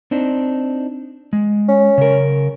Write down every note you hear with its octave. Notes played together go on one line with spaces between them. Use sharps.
C4 D4 D#4
G#3
C#4
C#3 A#4